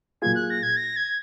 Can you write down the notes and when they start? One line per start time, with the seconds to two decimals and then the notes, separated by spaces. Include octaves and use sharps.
0.22 A#2 F#3 A#3 F4 G#4 G#6
0.35 F#6
0.50 A#6
0.63 G#6
0.77 A#6
0.97 G#6